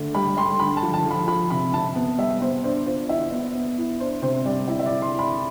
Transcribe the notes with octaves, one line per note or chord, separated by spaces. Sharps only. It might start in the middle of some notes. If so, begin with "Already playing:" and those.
Already playing: D3 A3
G3 B5
G3 C6
D3 B5
A5
F3
A5
F3 B5
F3 B5
C3 B5
C3 A5
B3
G3 E5
B3 C5
D4 C5
F4 C5
E3 E5
B3
B3
E4
D4 C5
C3 C5
G3 D5
E4 E5
E5
D5
E4
C6
E4
B5